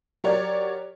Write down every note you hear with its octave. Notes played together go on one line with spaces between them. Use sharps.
F#3 G4 A#4 C#5 D5